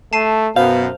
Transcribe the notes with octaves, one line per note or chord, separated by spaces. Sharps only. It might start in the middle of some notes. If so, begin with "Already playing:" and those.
A3 A5 C7 D#7
F#2 B2 B3 C5 F5